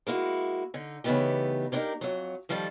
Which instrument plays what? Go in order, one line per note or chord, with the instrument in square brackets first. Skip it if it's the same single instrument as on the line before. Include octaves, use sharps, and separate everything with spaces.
[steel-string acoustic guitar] G#3 A#3 E4 F#4
D3 D#4
C#3 E3 A3 B3 D#4 G4
A#3 B3 D4 D#4 G4 A#4
F2 F#3
D#3 F3 G3 E4 A4 A5